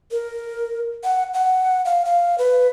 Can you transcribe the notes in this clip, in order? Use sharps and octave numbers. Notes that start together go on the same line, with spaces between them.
A#4
F#5
F#5
F5
F5
B4